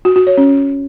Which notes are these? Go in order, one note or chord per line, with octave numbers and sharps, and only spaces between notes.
F#4
F#4
C#5
C#4